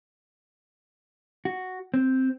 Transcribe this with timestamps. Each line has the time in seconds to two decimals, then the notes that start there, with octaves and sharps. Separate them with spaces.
1.45 F#4
1.94 C4